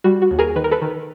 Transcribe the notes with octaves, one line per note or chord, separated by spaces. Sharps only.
G3 F#4
F#4
D#2
G#4 A#4
D#3 B4
A#4
A4 B4
D#3